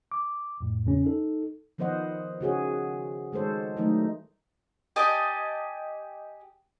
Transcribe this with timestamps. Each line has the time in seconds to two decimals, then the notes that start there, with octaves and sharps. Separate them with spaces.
0.12 D6
0.61 F2 A2
0.86 E2 C#3 C#4
1.05 D#4 A4
1.78 D#3 F3 B3 C5 D#5 F#5
2.41 C#3 F#4 G#4 C#5
3.32 D#3 G#3 A4 C5 C#5
3.77 D#3 E3 F#3 G3 A3 D#4
4.96 G4 D#5 G#5 A5